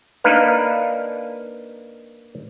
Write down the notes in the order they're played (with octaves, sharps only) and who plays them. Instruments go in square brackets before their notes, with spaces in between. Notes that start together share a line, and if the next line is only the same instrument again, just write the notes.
[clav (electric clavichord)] A#3 D4 D#4 A#4 B4 F5